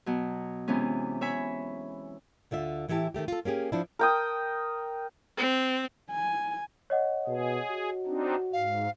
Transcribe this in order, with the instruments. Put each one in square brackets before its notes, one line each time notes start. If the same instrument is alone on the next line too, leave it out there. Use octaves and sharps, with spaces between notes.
[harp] B2 F#3
C3 E3 G#3 B3 C#4
C#5 E5 G#5 B5
[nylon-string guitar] D2 D3 F4 E5
A2 E3 E4 G4 A5
D#3 E3 A3 G4
F4 A4
A#3 C#4 G4 G#4
F3 D4 E4
[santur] A#4 G5 D#6
[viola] C4
[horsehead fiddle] G#5
[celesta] C#5 D#5 F#5
[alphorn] B2 [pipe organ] G#4
[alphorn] F#4
[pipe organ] C4 D4 D#4
[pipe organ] G#2 [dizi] F5